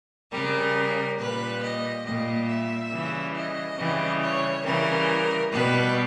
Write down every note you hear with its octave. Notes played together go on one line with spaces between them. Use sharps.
C#3 G3 A#4
A#2 G3 B4
D#5
A#2 G3 D#5
E5
C#3 E3 G3
D#5
C#3 E3 G3
C#5
C#3 E3 G3 A#4
B2 G3 B4